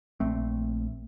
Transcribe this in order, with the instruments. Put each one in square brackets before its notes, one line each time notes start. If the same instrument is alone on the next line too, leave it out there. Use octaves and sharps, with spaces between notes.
[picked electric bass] A#1 A3 C4